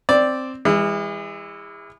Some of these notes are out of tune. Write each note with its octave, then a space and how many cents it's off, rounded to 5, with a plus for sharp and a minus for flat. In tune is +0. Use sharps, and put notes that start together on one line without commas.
C4 +0 D5 +0
E3 +0 G#3 -40